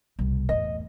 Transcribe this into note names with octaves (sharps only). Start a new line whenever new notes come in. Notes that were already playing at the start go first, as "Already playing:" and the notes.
C2 B2
E2 A2 D#5